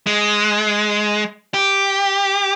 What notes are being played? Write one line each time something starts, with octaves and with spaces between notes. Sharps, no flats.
G#3
G4